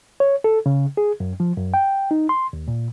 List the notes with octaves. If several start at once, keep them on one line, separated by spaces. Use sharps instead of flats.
C#5
A4
C#3
G#4
F#2
F3
F#2
G5
D#4
C6
D#2
A#2